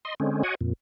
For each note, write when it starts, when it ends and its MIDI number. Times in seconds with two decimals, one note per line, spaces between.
0.05 0.15 75
0.05 0.15 84
0.20 0.43 50
0.20 0.43 56
0.20 0.43 60
0.20 0.43 61
0.43 0.55 66
0.43 0.55 73
0.43 0.55 75
0.43 0.55 78
0.43 0.55 80
0.61 0.73 41
0.61 0.73 46